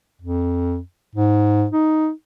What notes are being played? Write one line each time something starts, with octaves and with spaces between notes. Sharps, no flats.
F2
G#2
D#4